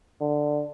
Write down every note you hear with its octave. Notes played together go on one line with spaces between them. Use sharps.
D3